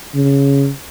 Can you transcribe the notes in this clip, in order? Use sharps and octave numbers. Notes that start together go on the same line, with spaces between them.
C#3